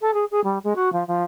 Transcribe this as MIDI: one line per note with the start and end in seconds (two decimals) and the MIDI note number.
0.01 0.14 69
0.14 0.25 68
0.31 0.41 68
0.44 0.59 55
0.64 0.74 56
0.76 0.92 66
0.93 1.06 53
1.07 1.23 53